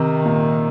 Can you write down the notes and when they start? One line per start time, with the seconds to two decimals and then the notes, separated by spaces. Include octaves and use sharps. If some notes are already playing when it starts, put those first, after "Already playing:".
Already playing: C3 D#3
0.25 A#2